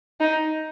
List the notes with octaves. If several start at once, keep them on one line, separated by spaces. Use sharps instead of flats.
D#4